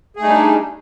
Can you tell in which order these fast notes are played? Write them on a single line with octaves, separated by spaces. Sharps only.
G#4 A3 D#4 G3 D4